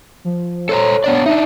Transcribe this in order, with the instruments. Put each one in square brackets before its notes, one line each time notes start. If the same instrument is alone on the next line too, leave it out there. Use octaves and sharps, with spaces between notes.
[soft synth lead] F3
[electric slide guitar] A4 C5 A#5 [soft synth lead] C#5
[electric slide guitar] B3 D4 D5
[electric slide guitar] D4 D#4 [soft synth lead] E5